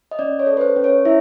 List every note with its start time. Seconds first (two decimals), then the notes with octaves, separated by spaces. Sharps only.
0.11 D#5
0.19 C#4 D5
0.39 C#5
0.47 A4
0.57 B4
0.61 C5
0.76 C#4
0.84 C#5
1.05 E4 E5